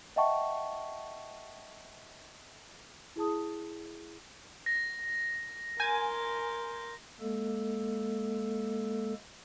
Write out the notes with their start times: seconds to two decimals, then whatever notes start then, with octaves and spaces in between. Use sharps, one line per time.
0.16 D#5 E5 F#5 G5 A5 C#6
3.16 E4 G#4 A5 D#6
4.66 A#6
5.80 A#4 G#5 C6 G6
7.20 G#3 A#3 A4